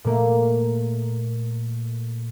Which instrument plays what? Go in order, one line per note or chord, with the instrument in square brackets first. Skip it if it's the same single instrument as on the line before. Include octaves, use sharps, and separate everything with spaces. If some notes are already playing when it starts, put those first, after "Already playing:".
[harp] A#2 A3 A#3